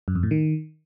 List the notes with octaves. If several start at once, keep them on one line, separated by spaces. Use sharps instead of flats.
F#2
F2
A2
D#3